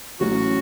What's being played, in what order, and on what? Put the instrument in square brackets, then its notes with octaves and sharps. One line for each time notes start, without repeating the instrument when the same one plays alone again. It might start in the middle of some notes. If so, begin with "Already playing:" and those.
[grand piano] A1 A2 F#3 A3 C#4 [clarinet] F#4